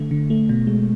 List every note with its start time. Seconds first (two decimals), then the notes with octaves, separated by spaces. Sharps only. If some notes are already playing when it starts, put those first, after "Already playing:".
Already playing: D3 A3
0.11 D3
0.30 A3
0.49 B2
0.67 G#3